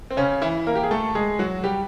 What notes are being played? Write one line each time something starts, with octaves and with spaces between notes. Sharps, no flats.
C4
C#3 C#4
E3 E4
A#3 A#4
G4
G#4
A3 A4
G#3 G#4
F#3 F#4
G3 G4